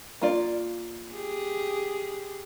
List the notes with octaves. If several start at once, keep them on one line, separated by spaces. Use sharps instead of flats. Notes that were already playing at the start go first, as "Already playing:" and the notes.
A#3 F4 D5
G4 G#4